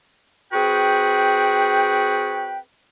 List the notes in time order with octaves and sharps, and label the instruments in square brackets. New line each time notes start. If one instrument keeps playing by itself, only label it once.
[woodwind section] C4 F#4 G#4 B4 G5